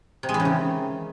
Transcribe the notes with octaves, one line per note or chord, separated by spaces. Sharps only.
C3
G#3
E3
C#3
D#3